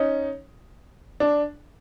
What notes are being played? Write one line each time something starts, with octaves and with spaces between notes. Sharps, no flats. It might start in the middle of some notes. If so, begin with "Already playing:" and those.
Already playing: C#4 D#4
D4